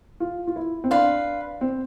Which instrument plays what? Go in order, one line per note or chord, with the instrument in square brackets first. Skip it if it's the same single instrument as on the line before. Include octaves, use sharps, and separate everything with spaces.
[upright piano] F4
F4
E4
C4
[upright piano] D4 [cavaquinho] B4 F5 C6
[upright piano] C4